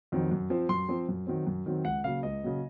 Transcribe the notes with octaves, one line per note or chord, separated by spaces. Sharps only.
F2 D#3 F#3 C4
F#2
F3 C4
F#2 C6
F3 C4
F#2
D#3 F#3 C4
F#2
D#3 F#3 C4
C#2 F#5
C#3 F#3 A#3 F5
C#2 D#5
C#3 F#3 A#3